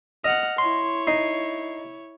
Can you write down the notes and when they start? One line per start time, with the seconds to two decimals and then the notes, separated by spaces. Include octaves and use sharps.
0.24 D#5 F#5 F6
0.58 E4 C#5 C6
1.07 D#4 C7